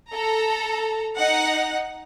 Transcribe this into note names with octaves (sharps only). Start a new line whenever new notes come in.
A4 A#5
D#4 F#5